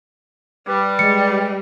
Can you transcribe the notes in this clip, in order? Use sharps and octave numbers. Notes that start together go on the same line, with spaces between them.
G3 B4 D5
G#3 C#7